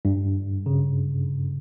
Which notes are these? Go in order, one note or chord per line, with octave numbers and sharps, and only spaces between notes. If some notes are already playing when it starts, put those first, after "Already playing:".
G2
C#3